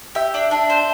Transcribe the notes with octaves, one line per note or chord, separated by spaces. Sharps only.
G4 E5
D4
D4
C5